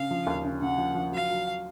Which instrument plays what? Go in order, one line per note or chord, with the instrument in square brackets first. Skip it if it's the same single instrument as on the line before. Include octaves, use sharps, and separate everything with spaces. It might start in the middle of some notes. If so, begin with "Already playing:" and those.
Already playing: [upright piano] C#3 [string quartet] F5
[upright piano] F3
D#2
C#3
[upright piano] C#3 [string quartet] F#5
[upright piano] F3
F3
[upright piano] F#3 [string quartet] F5
[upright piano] F#3